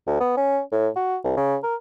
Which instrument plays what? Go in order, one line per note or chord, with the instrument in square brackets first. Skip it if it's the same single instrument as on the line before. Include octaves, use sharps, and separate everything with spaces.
[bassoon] D2
B3
C#4
A2
F#4
C2
C#3
A#4